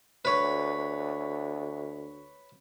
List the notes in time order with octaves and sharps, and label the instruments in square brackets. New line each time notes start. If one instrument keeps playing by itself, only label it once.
[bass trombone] D2 [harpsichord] B4 C#5